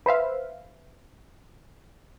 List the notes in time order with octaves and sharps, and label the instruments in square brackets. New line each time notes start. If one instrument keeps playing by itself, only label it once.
[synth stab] B4 C5 E5 F5